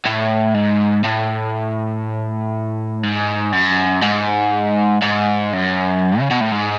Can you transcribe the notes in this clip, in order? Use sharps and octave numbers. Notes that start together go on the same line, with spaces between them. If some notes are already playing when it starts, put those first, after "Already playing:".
A2
G#2
A2
G#2
F#2
G#2
G#2
F#2
C#3
B2
A2
G#2